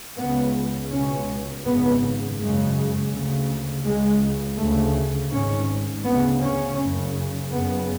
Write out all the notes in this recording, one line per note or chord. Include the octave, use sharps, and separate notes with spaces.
C#2 C#3 B3
C#2 B2 C#4
G#1 F#2 C#3 B3
F#1 F#2 C#3 G#3
D2 C#3
C#2 C#3 G#3
D2 C#3 A3
G#1 G#2 C#4
D2 C#3 B3
C#4
F#1 F#2 C#3
F#1 F#2 C#3 B3